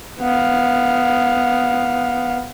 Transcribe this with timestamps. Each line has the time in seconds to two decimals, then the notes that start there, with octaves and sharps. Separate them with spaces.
0.20 B3 F5